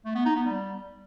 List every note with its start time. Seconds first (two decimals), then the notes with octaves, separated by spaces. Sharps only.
0.05 A3
0.15 B3
0.25 D#4
0.35 B3
0.46 G3